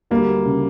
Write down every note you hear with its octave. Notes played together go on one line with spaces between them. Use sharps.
D2 G3 A#3
C#3